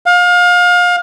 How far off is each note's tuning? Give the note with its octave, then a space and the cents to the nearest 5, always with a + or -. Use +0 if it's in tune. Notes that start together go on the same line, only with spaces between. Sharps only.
F5 +30